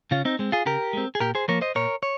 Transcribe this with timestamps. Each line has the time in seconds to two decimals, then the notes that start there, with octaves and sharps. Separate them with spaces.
0.11 C#3 C#4 F4
0.25 C4 D#4
0.39 G#3 C4
0.52 F4 G#4
0.66 C#3 G4 A#4
0.93 G#3 C4
1.15 G#4
1.21 A#2 G4 A#4
1.35 G#4 C5
1.48 F3 A#3 A#4 C#5
1.61 C5 D#5
1.75 A#2 A#4 C#5
2.03 C#5